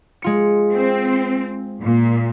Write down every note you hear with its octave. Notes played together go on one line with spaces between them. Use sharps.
G#3 F4 C#7
C4
A#2